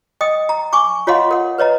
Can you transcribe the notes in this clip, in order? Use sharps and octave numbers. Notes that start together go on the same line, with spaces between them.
D#5 G5 D#6
A#5
G#5 C#6 D6
F4 C#5 D#5 F5 F#5 C6
A#4 F#5
B4 C#5 D#5 A#5